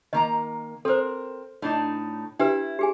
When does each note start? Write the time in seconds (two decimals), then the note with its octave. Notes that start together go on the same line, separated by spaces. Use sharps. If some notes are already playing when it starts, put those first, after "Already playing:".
0.13 D#3 A#3 D#5 A#5
0.85 C4 A4 A#4 C5
1.62 A2 D4 D#4
2.39 D4 E4 G4 B4
2.79 G4 G#4 G#5